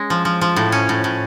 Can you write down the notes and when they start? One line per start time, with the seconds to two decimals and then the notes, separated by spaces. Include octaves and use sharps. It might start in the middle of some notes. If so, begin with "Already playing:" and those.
Already playing: G#3 C#4
0.10 F3
0.25 F3
0.41 F3
0.56 A2
0.72 C#4
0.89 A2
1.04 A2